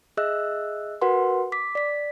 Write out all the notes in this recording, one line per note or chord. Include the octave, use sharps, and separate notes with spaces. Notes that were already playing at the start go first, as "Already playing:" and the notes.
G#4 D#5 E5 E6 F#6
F#4 A#4 B4 F#5 C6
D6 B6
D5 B6